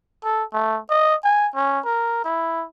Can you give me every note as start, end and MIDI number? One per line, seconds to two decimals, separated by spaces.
0.24 0.44 69
0.54 0.79 57
0.90 1.15 75
1.24 1.48 80
1.55 1.80 61
1.85 2.25 70
2.25 2.65 64